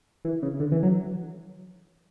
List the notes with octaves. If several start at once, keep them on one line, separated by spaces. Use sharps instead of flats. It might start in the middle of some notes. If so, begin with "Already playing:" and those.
E3
C#3
D3
E3
F#3